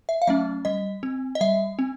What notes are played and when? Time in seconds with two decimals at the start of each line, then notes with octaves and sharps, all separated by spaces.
0.09 E5
0.22 F5
0.27 F#3 A3 C#4 E5
0.65 G3 D#5
1.03 C4
1.35 D#5
1.41 G3 E5
1.79 C4